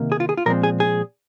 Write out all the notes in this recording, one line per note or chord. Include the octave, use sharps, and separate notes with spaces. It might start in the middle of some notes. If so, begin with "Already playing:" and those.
Already playing: C3 D#3 A#3
G#4
F4
G#4
F4
A#2 F3 G#3 C4 A#4
G#4
G#4